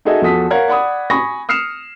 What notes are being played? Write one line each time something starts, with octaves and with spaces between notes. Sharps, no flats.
D#4 F#4 G#4 A4 D#5 E5
E2 F3 F#4 A4 D#6 B6
A#4 C#5 F5 F#5 G#6
D5 F#5 B5 D#6
G#5 B5 C#6 D#6 A#6
D#6 F6 C7 C#7 E7